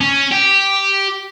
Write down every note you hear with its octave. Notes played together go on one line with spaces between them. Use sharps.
C#4
G4